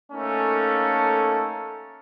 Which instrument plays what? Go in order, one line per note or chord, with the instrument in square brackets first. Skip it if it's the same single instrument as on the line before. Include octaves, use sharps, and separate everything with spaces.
[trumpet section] A3 A#3 C#4 D#4 A4